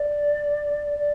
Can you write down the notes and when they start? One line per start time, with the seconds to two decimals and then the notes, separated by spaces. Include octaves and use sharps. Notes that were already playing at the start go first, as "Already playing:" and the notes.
Already playing: D5
0.98 D5